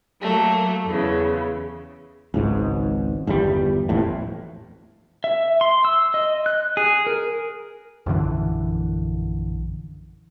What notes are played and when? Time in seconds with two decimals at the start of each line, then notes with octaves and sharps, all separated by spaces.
0.21 F#3 A3 A#3
0.86 E2 C#3
2.34 G#1 C#2 G#2
3.27 G1 E2 B2 G3
3.89 D#1 A1 F2 A2
5.24 E5
5.61 C6
5.85 E6
6.14 D#5
6.46 F#6
6.77 G#4
7.07 A#4
8.06 A#1 F#2 D3 E3